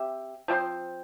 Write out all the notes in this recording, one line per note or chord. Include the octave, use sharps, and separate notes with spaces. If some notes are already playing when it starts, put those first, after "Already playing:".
Already playing: C4 G4 E5
F3 C4 G4 C5